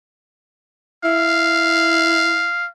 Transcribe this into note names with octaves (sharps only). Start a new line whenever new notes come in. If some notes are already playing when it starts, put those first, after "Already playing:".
E4 F5